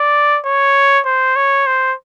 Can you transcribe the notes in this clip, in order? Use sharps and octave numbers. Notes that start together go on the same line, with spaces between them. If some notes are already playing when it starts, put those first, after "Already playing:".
Already playing: D5
C#5
C5
C#5
C5